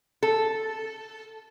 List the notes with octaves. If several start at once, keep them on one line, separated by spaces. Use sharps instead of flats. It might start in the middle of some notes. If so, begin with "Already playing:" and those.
A4